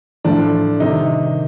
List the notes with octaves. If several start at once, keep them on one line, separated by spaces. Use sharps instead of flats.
A2 F3 A3 D4
C3 D#3 G3 D#4